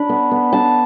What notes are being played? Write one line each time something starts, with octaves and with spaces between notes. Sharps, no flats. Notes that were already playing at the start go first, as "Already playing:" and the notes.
Already playing: D4 B5
B3
B3
D4 A5